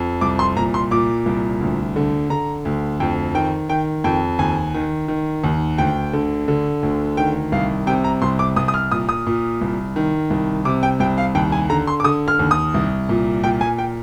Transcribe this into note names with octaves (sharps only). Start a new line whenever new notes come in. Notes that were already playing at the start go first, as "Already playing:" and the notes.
Already playing: F2
C2 D6
C6
A#2 A#5
C6
A#2 D6
C2
D2
D3
D3 A#5
D2
F2 G5
D#3 G5
D#3 G5
F2 G5
D#2 G#5
D#3
D#3
D#2
D2 G5
D3
D3
D2
D#3 G5
C2 F5
C3 G5
A#5
C2 C6
D6
C2 D#6
D#6
F6
A#2 D#6
D#6
A#2
C2
D#3
C2
C3 D6
G5
C2 G5
F5
D#2 G5
G#5
D3 A#5
C6
D6
D3 D#6
F6
D#2
D#6
C2
A#2
A#2 G5
G#5
G5